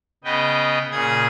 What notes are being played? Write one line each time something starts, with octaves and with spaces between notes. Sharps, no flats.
C#3 B3 B4 D#5 G5
A#2 C#3 G#4 D#6 G#6